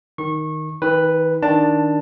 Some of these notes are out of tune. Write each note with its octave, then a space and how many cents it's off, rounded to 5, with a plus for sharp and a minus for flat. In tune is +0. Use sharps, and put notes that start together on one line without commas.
D#3 +0 C#6 -25
D#3 +35 B4 +0
D#3 +0 D4 +0 A5 +15